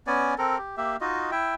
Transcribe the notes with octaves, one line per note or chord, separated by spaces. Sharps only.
B3 C#4 D5 G#5
C4 A4 A#4
G4
A#3 G4 E5
D#4 F4 F#4 D#5
E4 E5 G5